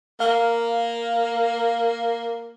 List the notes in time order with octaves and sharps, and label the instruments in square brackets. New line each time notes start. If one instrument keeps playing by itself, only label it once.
[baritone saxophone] A#3 [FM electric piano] F5